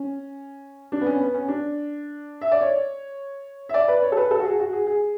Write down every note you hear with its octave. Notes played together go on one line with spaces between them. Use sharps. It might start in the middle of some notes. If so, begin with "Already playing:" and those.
Already playing: C#4
D4
B3
C#4
B3
C#4
D4
E5
D5
C#5
E5
D5
B4
C#5
A4
B4
A4
F#4
G#4
F#4
G#4
G#4